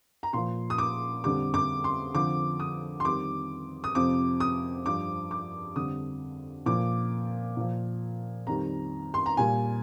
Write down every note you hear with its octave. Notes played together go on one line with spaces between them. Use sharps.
A#5
A#2 F3 C6
D#6
D6
F2 D3 G3 D6
D6
C6
F2 D3 F3 D6
D#6
C6
F2 D#3 G3 D6
D#6
F2 C3 F3 D6
D#6
G2 F3 D6
D6
F2 D3 G3 D#6
A#2 F3 D6
A#2 F3
F2 D#3 G3 A#5
C6
A#5
A#2 G3 G#5